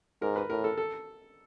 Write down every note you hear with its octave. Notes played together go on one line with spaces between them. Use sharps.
G#2 A#4
B4
A2 A#4
A4
A4